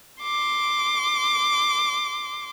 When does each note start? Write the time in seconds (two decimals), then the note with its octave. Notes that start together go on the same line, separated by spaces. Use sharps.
0.22 C6 D6